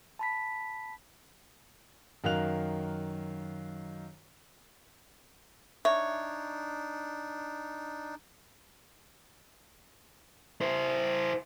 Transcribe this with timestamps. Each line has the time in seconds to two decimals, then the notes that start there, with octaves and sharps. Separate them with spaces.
0.19 A5 B5 B6
2.24 F#2 D#3 A#4 F5 F#6 F7
5.85 D4 D#4 C#5 E5
10.61 E4 C5